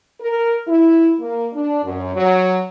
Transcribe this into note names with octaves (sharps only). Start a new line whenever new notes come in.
A#4
E4
A#3
D4
F#2
F#3